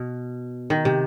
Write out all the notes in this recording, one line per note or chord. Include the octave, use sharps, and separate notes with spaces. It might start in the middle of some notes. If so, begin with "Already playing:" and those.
Already playing: B2
D#3
C3